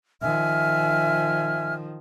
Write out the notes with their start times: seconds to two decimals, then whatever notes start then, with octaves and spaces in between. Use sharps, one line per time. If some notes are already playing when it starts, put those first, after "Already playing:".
0.22 D#3 F3 E5 G#5 F6